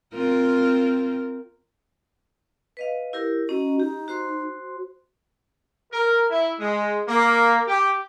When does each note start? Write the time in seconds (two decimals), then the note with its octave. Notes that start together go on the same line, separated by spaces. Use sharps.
0.14 C4 F4 A#4
2.77 B4 D#5 F5
3.13 E4 G4 A#4
3.49 C#4 F#4 D#5 A#5
3.80 D#4 G4
4.08 F#4 C5 C6
5.93 A#4
6.30 E4
6.60 G#3
7.08 A#3
7.67 G4